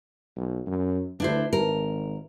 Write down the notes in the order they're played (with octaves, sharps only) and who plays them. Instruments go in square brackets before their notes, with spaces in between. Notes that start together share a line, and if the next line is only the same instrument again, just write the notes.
[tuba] B1
F#2
[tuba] D2 [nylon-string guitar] D4 E4 C5
[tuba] G#1 [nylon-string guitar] A#4